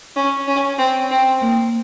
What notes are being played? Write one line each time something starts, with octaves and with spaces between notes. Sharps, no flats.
C#4
C#4
C4
C4
A#3